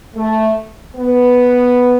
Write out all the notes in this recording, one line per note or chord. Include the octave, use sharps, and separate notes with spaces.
A3
B3